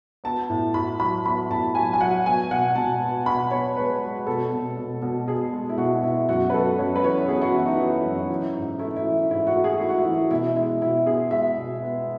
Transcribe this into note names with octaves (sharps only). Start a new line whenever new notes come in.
B3 A5
A2
A2 B5
F#3 B5
B3 B5
A2 A5
F#3 G#5
G#5
F#3 F#5
B3 G#5
B2 F#5
B2 A5
B3
B2 B5
B3 C#5
G#3 B4
G#3
B2 A4
B2
B2
B2
B2 G#4
G#3
E4
B2 F#4
B2 E4
F#2 F#4
B4
F#2 A4
F#2 C#5
B4
E3 C#5
B3 G#4
F#4
E3 E4
D#4
E3
F#2
E3
G#2
A3 E4
E4
E3
G#2 E4
F#4
A3
G#4
A3 E4
F#4
E4
E3
B2 E4
G#3 E4
B2 E4
B3 G#4
G#3 E5
B2
B3